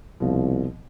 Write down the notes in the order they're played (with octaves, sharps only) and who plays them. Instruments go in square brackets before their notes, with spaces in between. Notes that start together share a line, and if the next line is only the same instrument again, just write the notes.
[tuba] C2 [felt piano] B2 F3